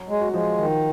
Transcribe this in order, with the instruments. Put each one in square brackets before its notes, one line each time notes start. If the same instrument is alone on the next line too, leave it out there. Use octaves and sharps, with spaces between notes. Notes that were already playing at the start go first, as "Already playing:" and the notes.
Already playing: [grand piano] F#3
[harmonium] G#3
[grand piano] F#4
[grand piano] F3 F4 [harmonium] G#3
[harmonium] D#3